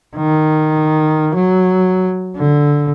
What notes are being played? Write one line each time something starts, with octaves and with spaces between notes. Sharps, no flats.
D#3
F#3
D3